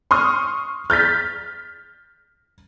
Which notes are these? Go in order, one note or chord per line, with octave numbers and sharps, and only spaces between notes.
C6 C#6 D#6 F6
F6 G6 A6 B6